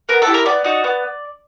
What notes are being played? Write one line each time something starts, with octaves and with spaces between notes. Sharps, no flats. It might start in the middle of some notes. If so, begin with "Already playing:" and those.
B3 A#4
A4
E4 G4
A#4
B3 D5
D#4 F#4
B3